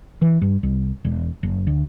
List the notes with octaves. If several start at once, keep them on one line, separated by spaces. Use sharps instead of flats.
E3
G2
C2
E1
F#1
D2